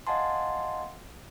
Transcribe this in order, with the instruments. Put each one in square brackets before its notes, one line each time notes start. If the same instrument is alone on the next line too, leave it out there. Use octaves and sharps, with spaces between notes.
[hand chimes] D#5 F5 F#5 G#5 A5 C6